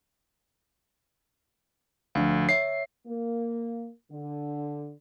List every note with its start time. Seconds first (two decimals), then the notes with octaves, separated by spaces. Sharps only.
2.15 D2 F3 D4 F5
2.49 C#5 E5 C7
3.05 A#3
4.11 D3